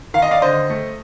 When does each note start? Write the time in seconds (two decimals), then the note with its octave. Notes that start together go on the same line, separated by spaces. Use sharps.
0.14 D#3 F5
0.22 D#5
0.31 D5 F5
0.42 D3 C5 D#5
0.70 A3